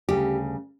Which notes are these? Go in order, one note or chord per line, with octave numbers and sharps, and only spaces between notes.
D2 C#3 G3 G4